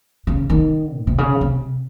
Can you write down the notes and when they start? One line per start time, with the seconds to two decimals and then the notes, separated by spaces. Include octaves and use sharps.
0.27 C#3
0.50 D#3
0.95 A2
1.07 C3
1.18 C#3
1.41 C3